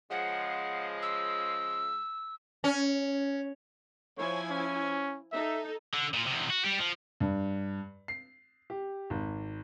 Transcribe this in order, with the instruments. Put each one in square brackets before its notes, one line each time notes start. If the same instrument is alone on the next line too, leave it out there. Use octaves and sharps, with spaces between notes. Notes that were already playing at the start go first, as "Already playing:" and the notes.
[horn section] C#3 F3 G#3 [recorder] F#5
[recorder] E6
[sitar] C#4
[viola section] F3 E4 G#5 [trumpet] C#5
[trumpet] C#4
[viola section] D#4 A4 [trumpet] E5
[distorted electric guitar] D3
A#2 F4
E2 C3
F#4
G3 G4
F3
[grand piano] G2
C7
G4
G#1